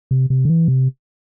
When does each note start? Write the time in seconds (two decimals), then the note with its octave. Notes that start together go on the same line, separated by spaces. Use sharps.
0.11 C3
0.30 C3
0.45 D3
0.49 E3
0.68 C3